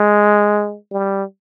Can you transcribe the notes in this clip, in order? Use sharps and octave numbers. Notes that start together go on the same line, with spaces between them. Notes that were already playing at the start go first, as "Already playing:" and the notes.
Already playing: G#3
G3